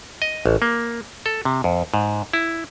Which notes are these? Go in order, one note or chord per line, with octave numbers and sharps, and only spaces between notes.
D#5
A1
A#3
A4
C3
F2
G#2
E4